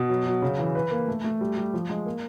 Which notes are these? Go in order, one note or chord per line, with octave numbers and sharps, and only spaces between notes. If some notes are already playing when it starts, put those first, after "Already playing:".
Already playing: B2
F#3
F#3
C#3
E3
B4
A#3
A3
A3
G3
G3
F3
G#3
A#3